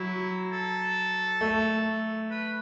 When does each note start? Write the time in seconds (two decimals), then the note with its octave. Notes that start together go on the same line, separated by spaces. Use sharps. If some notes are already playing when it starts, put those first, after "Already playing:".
Already playing: F#3 E4
0.52 A4
1.41 A3
2.31 B4